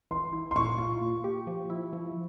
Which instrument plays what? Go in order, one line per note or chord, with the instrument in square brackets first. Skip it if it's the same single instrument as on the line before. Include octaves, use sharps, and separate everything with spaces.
[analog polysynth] E3 [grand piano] C6
[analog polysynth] E4
[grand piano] C6
[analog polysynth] A#2 [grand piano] C#6
[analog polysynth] F4
A#2
G4
F3
E4
F3